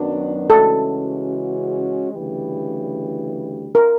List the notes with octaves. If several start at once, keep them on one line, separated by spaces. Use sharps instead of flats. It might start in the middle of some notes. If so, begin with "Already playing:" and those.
Already playing: F#2 D#3 F#3 B3 D4
C#3 E3 G#3 C#4 F#4 A4
D2 C#3 E3 G3
A#4